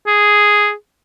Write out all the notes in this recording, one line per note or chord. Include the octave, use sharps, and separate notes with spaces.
G#4